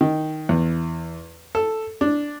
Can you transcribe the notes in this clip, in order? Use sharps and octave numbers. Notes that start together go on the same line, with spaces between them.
D#3
E2
A4
D4